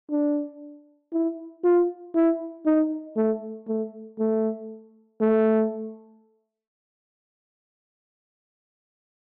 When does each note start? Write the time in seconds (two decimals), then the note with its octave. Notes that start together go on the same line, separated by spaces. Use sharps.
0.11 D4
1.13 E4
1.64 F4
2.15 E4
2.66 D#4
3.17 A3
3.68 A3
4.19 A3
5.21 A3